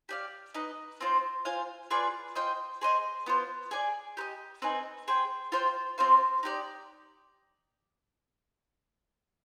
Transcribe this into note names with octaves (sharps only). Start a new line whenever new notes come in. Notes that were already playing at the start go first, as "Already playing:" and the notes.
G4 D5 F5
D#4 B4 D#5
C4 F4 C5
F4 C5 F5 G#5
F4 G#4 B4 D5
F4 C5 D#5 G5
G#4 C5 D#5
B3 F4 C5
G#4 D5 G#5
G4 B4 D#5
C4 D#4 G#4 B4
G#4 C5 G5
F4 C5 G5
C4 F4 C5 F5
D#4 G4 D5